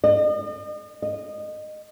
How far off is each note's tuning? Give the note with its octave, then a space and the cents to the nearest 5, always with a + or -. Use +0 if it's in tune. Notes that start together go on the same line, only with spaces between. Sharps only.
D#5 -40
D#5 -20